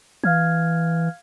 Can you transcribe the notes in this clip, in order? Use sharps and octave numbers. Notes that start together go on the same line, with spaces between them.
E3 F5 F6 G#6